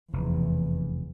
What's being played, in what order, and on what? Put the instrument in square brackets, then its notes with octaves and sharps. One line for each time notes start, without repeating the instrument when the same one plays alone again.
[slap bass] F1 [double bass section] B1 E2